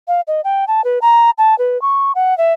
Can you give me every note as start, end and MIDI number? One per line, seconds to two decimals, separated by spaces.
0.08 0.21 77
0.27 0.41 75
0.44 0.65 79
0.68 0.84 81
0.84 0.99 71
1.02 1.30 82
1.38 1.57 81
1.58 1.80 71
1.82 2.12 85
2.15 2.37 78
2.38 2.53 76